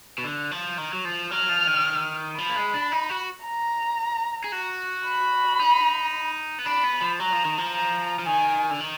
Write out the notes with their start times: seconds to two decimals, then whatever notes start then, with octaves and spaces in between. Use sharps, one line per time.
0.18 B2
0.24 D3
0.51 F3
0.78 D#3
0.93 F#3
1.05 F3
1.31 F#3 F6
1.49 F3
1.67 D#3
2.38 F3 B5
2.50 A#3
2.56 G#3
2.74 D4
2.92 D#4
3.09 F#4
3.45 A#5
4.44 G#4
4.52 F#4
5.06 B5
5.59 D#4
6.59 B3
6.66 D4 B5
6.84 B3
7.01 F3
7.20 F#3 A#5
7.32 F3
7.45 D#3
7.58 F3
7.73 A#5
8.19 F3
8.26 D#3 G#5
8.71 D3
8.80 D#3